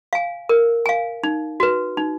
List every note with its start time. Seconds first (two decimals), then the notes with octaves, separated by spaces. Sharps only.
0.13 F5 G#5
0.49 A#4
0.86 F5 G#5
1.24 D#4
1.60 F#4 B4
1.97 D#4